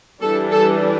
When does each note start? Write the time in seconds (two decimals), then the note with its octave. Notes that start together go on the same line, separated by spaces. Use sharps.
0.22 E3 G3 D4 A4
0.51 A4